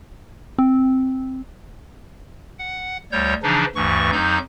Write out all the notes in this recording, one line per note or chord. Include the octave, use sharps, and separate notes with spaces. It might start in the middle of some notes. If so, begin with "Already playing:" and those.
C4
F#5
D2 G3 C#5 G6
C#3 E3 F3 D4 D#4
D2 G2 E3 C#6
F2 F#3 D#4 G6